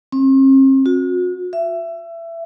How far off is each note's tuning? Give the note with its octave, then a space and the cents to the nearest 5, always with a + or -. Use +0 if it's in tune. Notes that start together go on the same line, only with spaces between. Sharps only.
C4 +45
F#4 -40
E5 +25